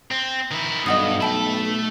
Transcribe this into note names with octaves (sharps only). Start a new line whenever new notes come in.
C4
D#3 E4
B1 G2 D#5 F#5 D#6
A3 E5 G5 A5 B5